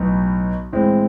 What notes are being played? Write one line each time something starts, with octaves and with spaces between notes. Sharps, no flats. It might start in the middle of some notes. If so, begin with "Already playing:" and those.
Already playing: B1 A2 F#3 B3 D#4
A2 E3 G#3 C4